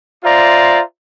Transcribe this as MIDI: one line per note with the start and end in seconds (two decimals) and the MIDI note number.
0.25 0.82 65
0.25 0.82 72
0.25 0.82 74
0.25 0.82 76
0.25 0.82 82